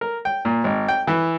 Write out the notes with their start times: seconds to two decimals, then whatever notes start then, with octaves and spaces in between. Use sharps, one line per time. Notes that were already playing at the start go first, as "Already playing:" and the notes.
0.01 A#4
0.25 G5
0.45 A#2
0.64 G#1
0.88 G5
1.07 E3